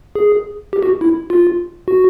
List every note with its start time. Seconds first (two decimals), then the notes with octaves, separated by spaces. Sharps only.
0.15 G#4
0.73 G4
0.83 F#4
1.01 E4
1.30 F4
1.88 F#4